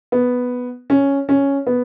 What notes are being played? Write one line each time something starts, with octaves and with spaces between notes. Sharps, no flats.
B3
C#4
C#4
B3